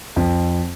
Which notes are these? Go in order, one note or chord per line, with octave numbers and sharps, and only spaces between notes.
F2